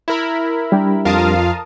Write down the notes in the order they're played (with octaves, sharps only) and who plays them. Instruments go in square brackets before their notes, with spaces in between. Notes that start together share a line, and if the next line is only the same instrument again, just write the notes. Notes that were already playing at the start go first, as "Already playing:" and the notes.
[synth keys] E4 A#4 B5
[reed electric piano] G3 D4 G4
[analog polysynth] F2 F4 F5 [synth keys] A#4 A5 D#6